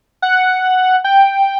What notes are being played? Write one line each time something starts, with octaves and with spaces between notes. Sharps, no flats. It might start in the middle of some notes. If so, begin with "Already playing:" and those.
F#5
G5